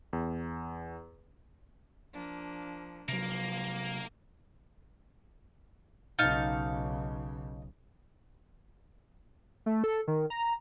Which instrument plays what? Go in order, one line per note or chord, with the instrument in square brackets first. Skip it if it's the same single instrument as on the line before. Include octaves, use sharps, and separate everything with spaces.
[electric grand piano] E2
[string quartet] F3 A#3 D4
[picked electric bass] C3 F#3 [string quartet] F3 [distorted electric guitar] A#3
[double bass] B1 C#3 [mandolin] D#4 F5 A5
[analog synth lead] A3
A4
D#3
A#5